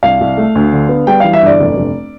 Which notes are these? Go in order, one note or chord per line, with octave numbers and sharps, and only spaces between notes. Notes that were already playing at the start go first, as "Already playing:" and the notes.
C2 F5
C2
A3
D2
D3
B3
G3 G5
E3 F5
E5
G1 D5
F1
F1